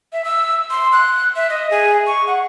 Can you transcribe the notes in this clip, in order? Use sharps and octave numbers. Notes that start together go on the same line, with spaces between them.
E5
E6
C6
F#6
E5
D#5
G#4
C#6
F#5